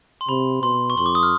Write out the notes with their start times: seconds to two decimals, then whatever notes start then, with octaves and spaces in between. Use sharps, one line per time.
0.21 C6
0.29 C3 B5
0.62 B2 C6
0.90 C#6
0.97 F2 C6
1.06 D6
1.15 D#6
1.23 F6